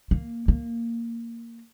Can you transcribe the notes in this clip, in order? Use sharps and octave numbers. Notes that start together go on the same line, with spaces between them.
A#3
A#3